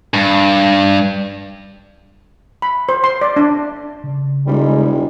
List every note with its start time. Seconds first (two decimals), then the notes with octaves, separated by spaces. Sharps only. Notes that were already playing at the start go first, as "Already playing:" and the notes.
0.14 G2
2.62 B5
2.89 C5
3.04 C6
3.21 D5
3.36 D4
4.04 C#3
4.47 E1 G3 G#3 D#4